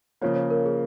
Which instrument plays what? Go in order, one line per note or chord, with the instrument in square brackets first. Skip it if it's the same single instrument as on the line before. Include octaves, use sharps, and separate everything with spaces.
[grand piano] C#3 F3 A#3 [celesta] C#5
[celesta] C#5
A#4
G#4